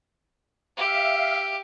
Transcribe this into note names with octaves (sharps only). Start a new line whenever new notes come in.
G4 E5 F5